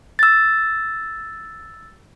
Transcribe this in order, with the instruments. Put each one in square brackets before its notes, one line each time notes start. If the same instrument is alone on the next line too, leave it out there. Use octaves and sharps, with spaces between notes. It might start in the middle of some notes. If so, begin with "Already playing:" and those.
[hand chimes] E6 A6